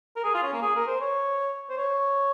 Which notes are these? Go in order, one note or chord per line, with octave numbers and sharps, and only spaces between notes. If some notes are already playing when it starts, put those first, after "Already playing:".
A#4
G#4
F4
C#4
A#3
G#4
A#4
C5
C#5
C5
C#5